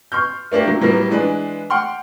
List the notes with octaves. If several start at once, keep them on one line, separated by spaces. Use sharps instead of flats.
C6 C#6 F6 G6
A3 A#3 D4 F4 G4
F#3
A2 F#3 G3 A#3 B3
E3 G#3 D4 B4
F#5 G5 C6 F6